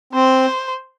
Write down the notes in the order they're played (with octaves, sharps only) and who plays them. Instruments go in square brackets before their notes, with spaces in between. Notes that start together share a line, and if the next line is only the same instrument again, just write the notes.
[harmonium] C4 [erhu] C5